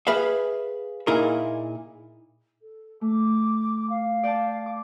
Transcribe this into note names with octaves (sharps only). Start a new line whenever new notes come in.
G#4 B4 E5 F5
A#2 D#4 E4 G#4 A#4
A4
A3 D6
F5
D5 G5 A5
D6